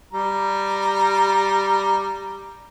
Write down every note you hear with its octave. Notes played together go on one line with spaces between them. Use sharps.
G3 A#5